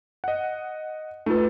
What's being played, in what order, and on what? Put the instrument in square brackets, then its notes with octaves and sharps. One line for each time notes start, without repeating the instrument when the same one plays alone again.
[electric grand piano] D#5 F#5
[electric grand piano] A3 A4 [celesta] D#4 F4 B4